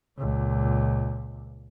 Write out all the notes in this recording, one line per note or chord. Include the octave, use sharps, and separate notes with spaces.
C#2 A#2